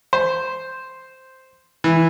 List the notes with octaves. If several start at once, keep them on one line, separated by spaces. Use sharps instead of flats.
C5
E3